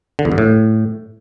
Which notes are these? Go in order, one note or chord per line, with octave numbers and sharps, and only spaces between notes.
D3
E2
G2
A2